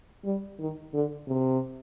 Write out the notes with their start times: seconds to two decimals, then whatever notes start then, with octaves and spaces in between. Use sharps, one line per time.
0.24 G3
0.59 D#3
0.93 D3
1.27 C3